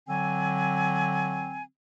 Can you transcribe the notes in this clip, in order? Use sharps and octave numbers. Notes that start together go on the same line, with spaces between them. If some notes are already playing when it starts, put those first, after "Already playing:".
D3 F#3 C4 G#5